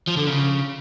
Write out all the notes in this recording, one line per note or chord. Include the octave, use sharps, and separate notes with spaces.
F3
D3
C#3